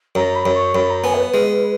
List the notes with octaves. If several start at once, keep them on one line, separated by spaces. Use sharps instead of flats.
F#2 A#5
B5
F#2
C#6
F#2 B5
A#5
B3 G#5
A#4
B4
G#3